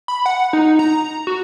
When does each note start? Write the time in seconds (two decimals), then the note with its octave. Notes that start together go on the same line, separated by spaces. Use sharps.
0.08 B5
0.26 F#5
0.53 D#4
0.79 A#5
1.27 F#4